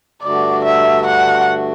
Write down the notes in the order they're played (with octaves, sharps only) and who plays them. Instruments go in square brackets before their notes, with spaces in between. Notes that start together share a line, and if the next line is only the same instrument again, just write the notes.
[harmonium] G2 D3 A3 D4 F#4 [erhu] D5
[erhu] E5
F#5